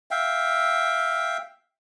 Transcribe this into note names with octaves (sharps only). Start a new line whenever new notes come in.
E5 F5 G5